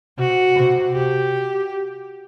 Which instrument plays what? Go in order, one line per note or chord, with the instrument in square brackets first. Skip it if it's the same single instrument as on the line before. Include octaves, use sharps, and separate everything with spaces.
[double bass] C3 [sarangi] F#4
[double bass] C3
[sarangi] G4